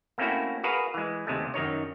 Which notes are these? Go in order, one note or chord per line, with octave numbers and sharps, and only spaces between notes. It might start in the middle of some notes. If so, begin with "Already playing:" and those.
A3 A#3 C4 C#4 E4 F#4
F#4 G#4 A#4 B4 F5
E3 G#3
D#2 C3 G#3 A3
F#2 D#3 D#4 C#5